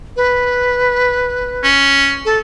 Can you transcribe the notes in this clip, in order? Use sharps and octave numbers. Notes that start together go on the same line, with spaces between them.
B4
C#4
A4